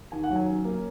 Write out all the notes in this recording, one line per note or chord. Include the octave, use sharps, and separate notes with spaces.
D#3 G#5
F#5
F#3
G#5
C#4
A#3